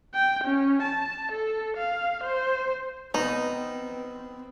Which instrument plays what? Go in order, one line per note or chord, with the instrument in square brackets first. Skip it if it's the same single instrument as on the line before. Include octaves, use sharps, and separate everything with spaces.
[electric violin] G5
C#4
A5
A4
F5
C5
[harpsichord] B3 [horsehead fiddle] C4 [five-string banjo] D#4 [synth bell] B4